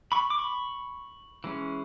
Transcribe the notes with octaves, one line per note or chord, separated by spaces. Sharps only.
B5 C#6
D6
B5 C#6
E3 G#3 C#4